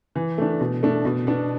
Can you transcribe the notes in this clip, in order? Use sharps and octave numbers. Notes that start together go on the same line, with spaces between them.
E3
A3 D4
B2
A3 D4
B2
B3 D4